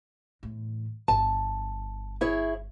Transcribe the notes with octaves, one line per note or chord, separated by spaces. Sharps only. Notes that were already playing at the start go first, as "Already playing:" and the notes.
E2 A2
G1 A5
E4 G#4 C#5